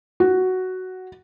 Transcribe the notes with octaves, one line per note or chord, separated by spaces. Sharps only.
F#4